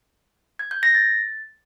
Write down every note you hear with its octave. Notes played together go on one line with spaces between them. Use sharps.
G#6
G6
A#6
A6